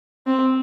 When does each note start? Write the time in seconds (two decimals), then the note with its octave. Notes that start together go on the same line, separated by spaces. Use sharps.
0.27 C4